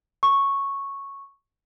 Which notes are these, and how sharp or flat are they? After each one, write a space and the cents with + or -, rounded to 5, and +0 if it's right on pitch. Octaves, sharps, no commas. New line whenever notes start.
C#6 -5